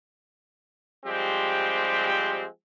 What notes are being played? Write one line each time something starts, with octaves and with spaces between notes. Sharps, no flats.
F3 G3 G#3 C4 G4